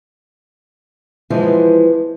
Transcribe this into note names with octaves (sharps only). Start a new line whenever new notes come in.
E3 F3 G#3 B3